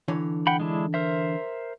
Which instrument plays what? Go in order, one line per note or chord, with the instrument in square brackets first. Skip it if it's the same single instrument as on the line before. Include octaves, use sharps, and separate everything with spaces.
[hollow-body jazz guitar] D3 E3 C#5
[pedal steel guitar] F#5 G5 B5
G#3 D4 E4
A#4 C5 E5